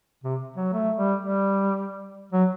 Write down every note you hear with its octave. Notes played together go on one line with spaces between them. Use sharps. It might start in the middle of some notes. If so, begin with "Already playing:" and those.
C3
F#3
A3
G3
G3
F#3